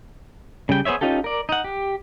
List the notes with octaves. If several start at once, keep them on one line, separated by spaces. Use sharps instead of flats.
C#3 G3 G5
B3 G#4 C5 C#5 E5
C#4 D#4 F4 G4 A4
A#4 D5
D#4 F#5
G4